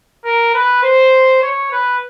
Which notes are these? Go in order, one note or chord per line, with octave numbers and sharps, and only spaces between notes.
A#4
B4
C5
C#5
B4